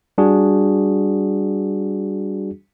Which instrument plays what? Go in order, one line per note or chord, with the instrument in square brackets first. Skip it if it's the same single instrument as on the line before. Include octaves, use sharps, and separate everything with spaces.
[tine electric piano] G3 D4 F#4 G#4